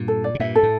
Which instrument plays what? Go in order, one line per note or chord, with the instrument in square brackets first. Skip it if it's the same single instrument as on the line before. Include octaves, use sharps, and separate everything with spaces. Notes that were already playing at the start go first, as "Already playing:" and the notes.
Already playing: [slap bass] G2 A#2
[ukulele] A4
D5
[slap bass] C3
[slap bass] G2 A#2 [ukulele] E5
[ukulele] A4
[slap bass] A2